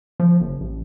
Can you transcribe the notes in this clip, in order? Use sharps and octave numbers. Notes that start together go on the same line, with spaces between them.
F3
F#1
A1